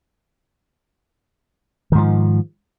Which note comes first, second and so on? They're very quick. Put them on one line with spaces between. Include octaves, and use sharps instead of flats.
D#3 G#2 F3